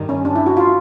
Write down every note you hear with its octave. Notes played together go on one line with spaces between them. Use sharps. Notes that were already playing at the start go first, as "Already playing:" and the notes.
Already playing: G2 D#3 G3
C#4
D4
E4
F#4
F4